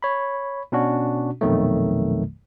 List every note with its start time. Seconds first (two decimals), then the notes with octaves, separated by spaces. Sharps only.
0.03 C#5 B5
0.72 B2 C#4 D4 F#4
1.41 A#1 F2 B2 D#3 F#3 A3